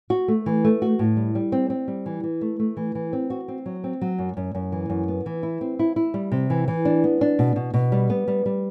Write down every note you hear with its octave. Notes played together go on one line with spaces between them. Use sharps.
F#4
A3
E3
A3
F#4
A2
G3
G3
C4
C4
G3
E3
E3
A3
A3
E3
E3
C4
F#4
C4
F#3
C4
F#3
F#2
F#2
F#2
E3
F#2
B3
E3
E4
C4
E4
E4
G3
C3
E3
E3
D4
B3
D4
B2
B2
B2
G3
B3
G3
G3